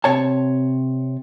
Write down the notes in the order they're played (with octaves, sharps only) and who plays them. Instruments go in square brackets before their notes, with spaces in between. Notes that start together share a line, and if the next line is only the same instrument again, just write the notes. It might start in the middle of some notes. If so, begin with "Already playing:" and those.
[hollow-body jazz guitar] C3 C#5 A5